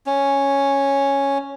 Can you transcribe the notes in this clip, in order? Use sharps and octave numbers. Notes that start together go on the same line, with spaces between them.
C#4